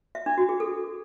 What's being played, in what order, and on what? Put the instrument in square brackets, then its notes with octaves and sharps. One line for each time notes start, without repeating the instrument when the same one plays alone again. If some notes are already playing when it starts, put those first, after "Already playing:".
[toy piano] E5
D4
F#4
G#4
A4